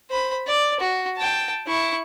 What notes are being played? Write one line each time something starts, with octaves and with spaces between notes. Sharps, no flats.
C5 B5
D5
F#4
G5 A5
E4 C#6